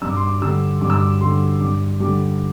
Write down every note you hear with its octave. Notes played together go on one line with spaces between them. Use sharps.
G2 E6
D6
C6
D6
D3 G3 E6
G2 D6
E6
D6
D3 G3 C6
G2 D6
D3 G3 D6